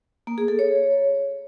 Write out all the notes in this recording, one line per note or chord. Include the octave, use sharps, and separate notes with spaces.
A#3
G#4
A4
C#5